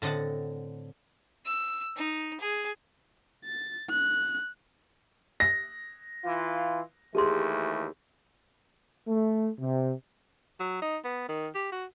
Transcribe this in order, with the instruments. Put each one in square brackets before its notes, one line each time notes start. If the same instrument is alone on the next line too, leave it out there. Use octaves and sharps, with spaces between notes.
[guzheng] A2 D3 C4 D#5 F#5 A5
[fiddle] E6
D#4
G#4
[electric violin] A6
F#6
[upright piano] A#6
[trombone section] E3 F4
[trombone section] D#2 E3 A3 [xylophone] G4 G#4 C6
[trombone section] A3
C3
[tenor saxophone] F#3
D#4
B3
D#3
G4
F#4